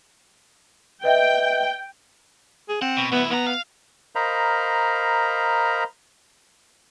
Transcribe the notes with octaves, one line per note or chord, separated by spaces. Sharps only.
B4 D#5 E5 G5
G#4
C4 F#5
B2
D2 B3 E4
D#2 B3 A#5
F5
A#4 C5 D#5 F5 A#5 B5